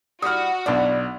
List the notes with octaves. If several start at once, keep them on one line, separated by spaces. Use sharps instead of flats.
G3 E4 F#4 D#6 F6
B1 D4 E4 D5